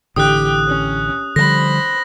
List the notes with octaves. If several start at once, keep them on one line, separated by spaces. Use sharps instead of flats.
A1 D3 G4 G5 D#6 F#6
C#4
D3 F3 G3 C5 B5 A#6